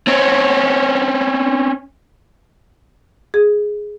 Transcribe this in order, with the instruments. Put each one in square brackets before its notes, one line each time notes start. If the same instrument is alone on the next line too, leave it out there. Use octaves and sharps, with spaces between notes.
[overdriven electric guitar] C4 C#4
[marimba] G#4